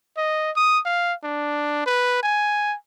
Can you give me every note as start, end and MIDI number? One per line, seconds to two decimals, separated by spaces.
0.17 0.51 75
0.56 0.79 87
0.85 1.13 77
1.24 1.86 62
1.86 2.22 71
2.23 2.75 80